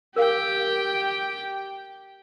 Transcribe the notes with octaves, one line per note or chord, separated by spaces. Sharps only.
G4 A#4 F5 G5